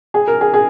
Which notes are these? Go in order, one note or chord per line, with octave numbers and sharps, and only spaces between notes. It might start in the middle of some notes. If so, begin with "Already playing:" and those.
G#4
A#4
G#4
G#4